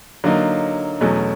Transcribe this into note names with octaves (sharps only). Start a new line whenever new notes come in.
D3 F#3 A#3 D#4
E2 B2 F#3 A3 C#4